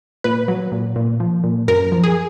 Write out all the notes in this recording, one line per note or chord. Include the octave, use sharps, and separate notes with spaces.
A#2 B4
F#3
A#2
A#2
F3
A#2
F#2 A#4
F3
G#4